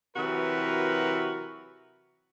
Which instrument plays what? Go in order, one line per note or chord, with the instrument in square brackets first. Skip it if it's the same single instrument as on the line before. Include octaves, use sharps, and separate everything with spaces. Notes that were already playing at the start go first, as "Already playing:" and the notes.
[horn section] C3 E3 F#3 F#4 A#4 B4